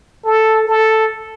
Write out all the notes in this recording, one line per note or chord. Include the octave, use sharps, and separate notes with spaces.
A4
A4